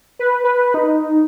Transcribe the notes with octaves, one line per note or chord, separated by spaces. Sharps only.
B4
B4
D#4